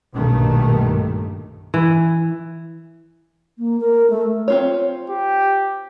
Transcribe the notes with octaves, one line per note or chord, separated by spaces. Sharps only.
B1 G2 A#2 D#3 A3
E3
A#3
A#4
A3
C4 F4 C#5
G4